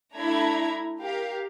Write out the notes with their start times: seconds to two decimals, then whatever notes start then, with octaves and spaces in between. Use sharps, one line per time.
0.15 A3 D4 E4 A#5 B5 G#6
0.99 G4 A#4 F5